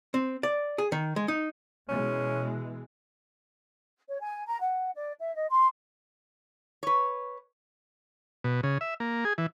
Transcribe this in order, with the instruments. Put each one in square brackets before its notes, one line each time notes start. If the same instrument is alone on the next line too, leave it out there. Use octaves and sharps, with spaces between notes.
[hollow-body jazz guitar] C4
D5
G#4
D#3
G#3
D#4
[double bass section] B2 E3 G#3 [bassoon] C#4
[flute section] C#5
G#5
A#5
F#5
D5
E5
D#5
C6
[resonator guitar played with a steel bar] B4 C#5
[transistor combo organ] B2
C#3
E5
A#3
G#4
E3